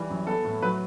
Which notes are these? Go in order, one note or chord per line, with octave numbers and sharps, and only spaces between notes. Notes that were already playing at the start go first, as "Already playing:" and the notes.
Already playing: E3 G3
F#2
B3 A4
A2
F#3 B4